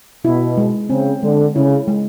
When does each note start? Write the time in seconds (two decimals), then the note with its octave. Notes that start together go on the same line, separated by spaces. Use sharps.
0.25 B2 E4
0.57 G#3
0.90 C#3 C4
1.23 D3 G#3
1.55 C#3 E4
1.88 G#3